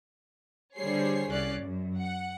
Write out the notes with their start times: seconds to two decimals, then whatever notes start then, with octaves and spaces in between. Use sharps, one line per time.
0.76 D3 G3 G#4 C5 C#5 C7
1.29 C2 C#4 D5 F#6 C7
1.62 F#2
1.99 F#5